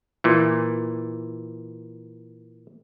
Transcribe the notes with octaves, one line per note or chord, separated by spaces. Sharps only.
A#2 E3